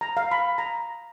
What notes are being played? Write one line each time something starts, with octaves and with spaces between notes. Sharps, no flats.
A#5
F5
B5
A#5